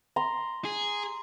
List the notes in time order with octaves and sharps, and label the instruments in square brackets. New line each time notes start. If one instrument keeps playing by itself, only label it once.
[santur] A#5 C6
[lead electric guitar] G#4